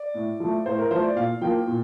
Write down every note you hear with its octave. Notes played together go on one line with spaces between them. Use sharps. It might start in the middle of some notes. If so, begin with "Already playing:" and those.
Already playing: D5
A2
F3 A3
A2 C5
A#4
F3 A3 C5
D5
A#2 F5
F3 A#3 G5
A#2